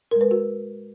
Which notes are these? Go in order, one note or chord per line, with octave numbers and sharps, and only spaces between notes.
A#2 G#3 A#4
B4
F#4 A#4